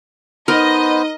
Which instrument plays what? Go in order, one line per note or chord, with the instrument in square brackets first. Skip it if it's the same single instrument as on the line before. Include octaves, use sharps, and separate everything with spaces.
[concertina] B3 C5 [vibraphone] D#4 [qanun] A#4 [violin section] D#5